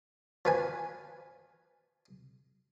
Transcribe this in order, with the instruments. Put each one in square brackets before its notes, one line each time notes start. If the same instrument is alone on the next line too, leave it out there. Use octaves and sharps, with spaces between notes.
[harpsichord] F3 B4 G#5